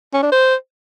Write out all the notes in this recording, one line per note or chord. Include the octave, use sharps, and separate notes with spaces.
C#4
D4
C5